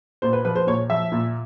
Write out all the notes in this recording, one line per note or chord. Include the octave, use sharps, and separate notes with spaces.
A#2 C5
B4
F3 B4
C5
A#2 C#5
F3 E5
A#2